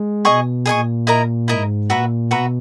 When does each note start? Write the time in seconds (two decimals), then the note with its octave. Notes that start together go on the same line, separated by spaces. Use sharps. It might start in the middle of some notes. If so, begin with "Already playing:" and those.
Already playing: G#3
0.25 B2 G#4 D#5 G#5 C#6
0.66 A#2 G#4 D#5 G#5 C#6
1.07 E4 A#4 D#5 A#5
1.48 G#2 E4 A#4 D#5 A#5
1.89 A#2 F#4 B4 E5 A#5
2.30 B2 F#4 B4 E5 A#5